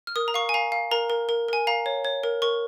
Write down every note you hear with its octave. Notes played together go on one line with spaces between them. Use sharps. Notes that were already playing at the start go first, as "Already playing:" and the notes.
F6
A#4 D#6
A#5
F5 C#6
G#5
F5 A#5
F5
A#4 A#5
A#4
A#4
A#4 G#5
F5 A#5
C#5
C#5
A#4
A#4 C#6